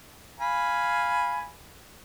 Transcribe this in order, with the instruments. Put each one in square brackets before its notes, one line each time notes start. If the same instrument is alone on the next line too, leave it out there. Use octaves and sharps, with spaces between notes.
[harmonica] F5 G#5 B5